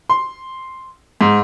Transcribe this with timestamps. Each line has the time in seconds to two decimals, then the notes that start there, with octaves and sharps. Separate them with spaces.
0.10 C6
1.21 G#2